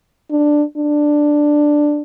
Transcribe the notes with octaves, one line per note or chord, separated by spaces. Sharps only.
D4
D4